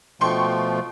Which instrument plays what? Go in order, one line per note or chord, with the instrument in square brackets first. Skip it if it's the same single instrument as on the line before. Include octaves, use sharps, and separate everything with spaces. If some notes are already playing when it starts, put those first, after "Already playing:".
[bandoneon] B2 F3 A3 [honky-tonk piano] G5 C6 C#6